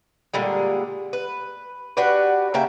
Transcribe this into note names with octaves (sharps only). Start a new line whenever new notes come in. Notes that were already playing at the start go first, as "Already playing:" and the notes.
A#2 D3 G3 G#3
B4
D4 F#4 G4 B4
C#3 A#3 E5 G5